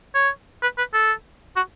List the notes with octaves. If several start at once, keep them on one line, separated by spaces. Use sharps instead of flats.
C#5
B4
B4
A4
F#4